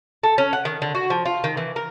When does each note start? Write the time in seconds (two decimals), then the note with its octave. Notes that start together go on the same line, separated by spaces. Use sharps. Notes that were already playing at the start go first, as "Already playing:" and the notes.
0.23 A4
0.38 C#4
0.53 F#5
0.65 D#3
0.82 D3
0.95 F#4
1.10 F3
1.25 F4
1.44 D#3
1.57 E3
1.76 A#4